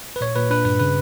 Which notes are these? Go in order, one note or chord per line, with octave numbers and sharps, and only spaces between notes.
B4
A#2 C#5
A#2 B4
D4 B4
G2 B4
C#3 B4